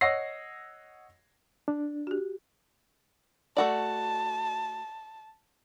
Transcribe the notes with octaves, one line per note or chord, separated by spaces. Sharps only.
C#5 D#5 F#5 E6 A#6 C7
D4
F#4 G4
A3 F#4 D5 A5